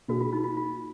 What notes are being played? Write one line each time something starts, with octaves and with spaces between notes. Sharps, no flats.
B2 A#3 D4 F#4 G#4
F4
D#4
F4
F4